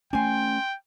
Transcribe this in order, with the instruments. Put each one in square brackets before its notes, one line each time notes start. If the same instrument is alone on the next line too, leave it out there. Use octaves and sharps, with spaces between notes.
[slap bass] A3 C#4 [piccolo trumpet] G5 [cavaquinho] G#5 C6